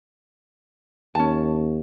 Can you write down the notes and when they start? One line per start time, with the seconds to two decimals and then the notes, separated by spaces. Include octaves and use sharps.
1.15 D#2 C#4 A5